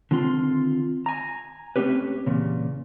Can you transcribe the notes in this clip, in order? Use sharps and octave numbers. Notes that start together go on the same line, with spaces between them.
D3 D#3 C4 F4 C6
G#5 A#5
A3 A#3 C4 C#4 G4 B4
E2 A#2 C#3